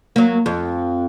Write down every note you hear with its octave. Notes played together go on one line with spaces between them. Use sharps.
F#3 A#3
F2